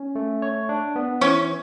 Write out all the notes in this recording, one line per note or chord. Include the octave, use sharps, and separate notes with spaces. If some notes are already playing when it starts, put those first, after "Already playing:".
Already playing: C#4
A3
C#5
D4
B3
E3 C#4